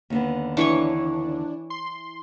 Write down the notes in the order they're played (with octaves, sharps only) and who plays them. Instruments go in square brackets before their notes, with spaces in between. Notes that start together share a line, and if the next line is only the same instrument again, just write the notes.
[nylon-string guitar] D#2 D3 B3
[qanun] E3 C#5 C#6 [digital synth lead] D4
[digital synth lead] C6